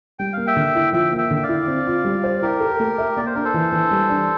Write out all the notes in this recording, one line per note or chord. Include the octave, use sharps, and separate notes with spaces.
G3 G5
A#3 F5
E5 G5
D3
E4
F3 E5 G5
A#3
E5 G5
D3
G5
D5 F5
E4
C4
F4
G3
C5
E4 G4 A#4
A4
A3
E5
A#3 D5
C5
D4 A#4
A4 C5
E3
E3
G3
D4